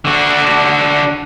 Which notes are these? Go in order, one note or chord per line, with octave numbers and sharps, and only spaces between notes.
D3 F#4